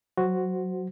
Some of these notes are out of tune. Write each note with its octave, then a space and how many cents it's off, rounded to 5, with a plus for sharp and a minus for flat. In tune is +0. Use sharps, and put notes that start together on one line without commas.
F#3 +0 F#4 +0 C5 +0